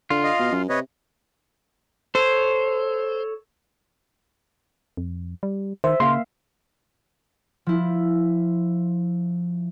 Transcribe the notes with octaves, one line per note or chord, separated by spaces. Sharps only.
D3 F4
D#5 F5
B2
F#2
C3 B4 C#5 D#5
A4 C5 C#5
F2
G3
D#3 C5 E5
C#3 A#3 F5 C6
F3 E4